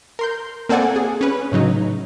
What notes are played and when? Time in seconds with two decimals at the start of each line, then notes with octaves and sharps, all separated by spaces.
0.19 A#4 C6 G6
0.69 A#3 C4 A4 D5 F#5 G#5
0.96 G#4
1.21 C#4 B4
1.52 A2 C#3 F#3 D#4